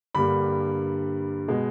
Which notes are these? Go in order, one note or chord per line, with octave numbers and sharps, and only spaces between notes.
G2 D3 G3 A#3 B5
B2 G#3